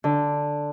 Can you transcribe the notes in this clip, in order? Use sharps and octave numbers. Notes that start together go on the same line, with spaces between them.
D3